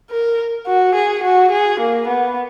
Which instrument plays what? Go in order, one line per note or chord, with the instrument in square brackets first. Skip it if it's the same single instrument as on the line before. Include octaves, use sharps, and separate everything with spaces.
[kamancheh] A#4
F#4
G#4
F#4
G#4
A#3
B3